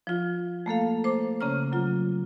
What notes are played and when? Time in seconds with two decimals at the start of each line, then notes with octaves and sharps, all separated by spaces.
0.07 F3 F4
0.66 A3 A#3 A4 F5
1.04 C5 D6
1.40 C#3 C#4 A#5 F6
1.72 F#3 F4